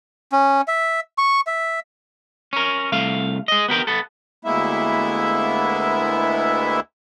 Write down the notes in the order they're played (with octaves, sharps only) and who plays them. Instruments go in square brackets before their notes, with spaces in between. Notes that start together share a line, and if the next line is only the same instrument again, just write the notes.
[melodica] C#4
E5
C#6
E5
[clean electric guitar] C#4 A#4
C2 A3 F5
G#4 D#5
B3 G4 A#4 G5
B3 A4
[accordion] D2 G#3 A#3 B3 E4 E5